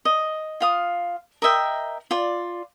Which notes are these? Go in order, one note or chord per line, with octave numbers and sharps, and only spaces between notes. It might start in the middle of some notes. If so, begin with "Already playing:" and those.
D#5
F4 F5 D#6
A#4 D#5 E5 G5
F4 D5